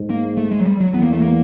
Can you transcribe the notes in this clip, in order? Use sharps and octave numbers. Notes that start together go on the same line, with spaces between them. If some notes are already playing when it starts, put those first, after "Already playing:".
Already playing: G#2
A#3
A3
G#3
F#3
G3
F#3
E2 B3
A#3
A3
A#3